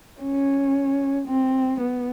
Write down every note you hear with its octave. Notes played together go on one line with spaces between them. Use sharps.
C#4
C4
B3